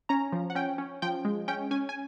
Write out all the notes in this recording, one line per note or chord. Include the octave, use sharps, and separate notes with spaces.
C#4 A#5
F3
F#5
C#4 G5
C#4
F3 G5
G#3
C#4 G5
C#4 G#5
G#5